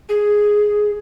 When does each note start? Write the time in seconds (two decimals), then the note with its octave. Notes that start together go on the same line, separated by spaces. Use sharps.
0.09 G#4